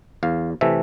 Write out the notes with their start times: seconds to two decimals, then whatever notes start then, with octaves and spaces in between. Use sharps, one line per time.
0.23 E2 F5
0.61 C3 E3 A3 E5